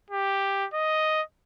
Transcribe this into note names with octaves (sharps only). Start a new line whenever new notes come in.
G4
D#5